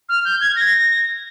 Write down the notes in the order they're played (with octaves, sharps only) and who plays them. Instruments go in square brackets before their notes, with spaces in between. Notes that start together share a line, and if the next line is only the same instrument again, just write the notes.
[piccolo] F6
G6
G#6
A#6